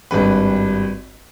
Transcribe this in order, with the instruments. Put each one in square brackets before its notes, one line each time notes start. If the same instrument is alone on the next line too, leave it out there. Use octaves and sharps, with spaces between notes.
[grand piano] G#1 G2 B4